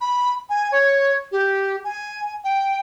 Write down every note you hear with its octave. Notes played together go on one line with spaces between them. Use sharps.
B5
G#5
C#5
G4
G#5
G5